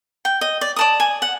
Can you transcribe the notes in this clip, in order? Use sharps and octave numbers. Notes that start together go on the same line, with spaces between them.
G5
D#5
D5
D5 A5 D#6
G#5
F#5